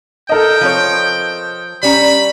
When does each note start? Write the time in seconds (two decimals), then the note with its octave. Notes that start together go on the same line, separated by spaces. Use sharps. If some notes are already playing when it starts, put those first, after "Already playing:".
0.29 A4 A#4 D#5 G5
0.61 F3 C4 C#5
1.83 G3 C#4 A#5 B5